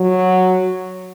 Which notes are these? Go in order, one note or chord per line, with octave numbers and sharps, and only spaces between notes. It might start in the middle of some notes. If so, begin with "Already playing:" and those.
Already playing: F#3